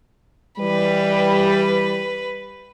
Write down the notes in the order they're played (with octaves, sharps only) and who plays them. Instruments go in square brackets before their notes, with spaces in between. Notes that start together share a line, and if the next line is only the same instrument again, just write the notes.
[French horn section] E3 G3 [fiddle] B4